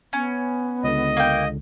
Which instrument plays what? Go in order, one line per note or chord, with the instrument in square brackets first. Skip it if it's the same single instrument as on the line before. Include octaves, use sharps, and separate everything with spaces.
[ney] B3 [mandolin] C#4
[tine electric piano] C#2 D3 [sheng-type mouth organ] D#5
[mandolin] A#3 G5